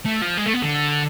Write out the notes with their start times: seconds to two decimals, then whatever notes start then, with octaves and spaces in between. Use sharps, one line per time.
0.06 A3
0.22 F3
0.38 G#3
0.46 A3
0.54 B3
0.63 D3